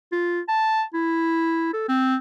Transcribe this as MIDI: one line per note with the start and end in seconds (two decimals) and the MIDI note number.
0.12 0.41 65
0.48 0.83 81
0.94 1.72 64
1.73 1.88 69
1.88 2.16 60